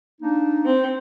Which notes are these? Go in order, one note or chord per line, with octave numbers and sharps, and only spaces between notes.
A#3 D4 D#4
C4